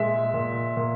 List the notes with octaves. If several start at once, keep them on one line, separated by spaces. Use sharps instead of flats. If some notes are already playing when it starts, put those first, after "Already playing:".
Already playing: A#2 G#3 E5
A#2
A#2